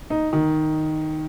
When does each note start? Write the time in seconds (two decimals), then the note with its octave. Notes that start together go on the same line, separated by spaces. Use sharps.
0.10 D#4
0.33 D#3